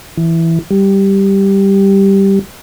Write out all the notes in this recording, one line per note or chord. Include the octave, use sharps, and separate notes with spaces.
E3
G3